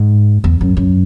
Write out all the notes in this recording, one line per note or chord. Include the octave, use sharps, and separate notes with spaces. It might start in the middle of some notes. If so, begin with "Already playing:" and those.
Already playing: G#2
E2
F#2
F#2